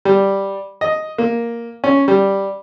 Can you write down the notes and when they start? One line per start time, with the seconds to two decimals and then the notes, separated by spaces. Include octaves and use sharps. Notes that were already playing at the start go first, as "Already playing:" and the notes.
0.05 G3
0.81 D#5
1.18 A#3
1.84 C#4
2.08 G3